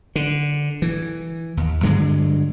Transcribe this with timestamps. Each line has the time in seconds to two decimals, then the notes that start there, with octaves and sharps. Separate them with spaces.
0.16 D3
0.82 E3
1.57 D#2
1.83 G2 D3 F#3 G#3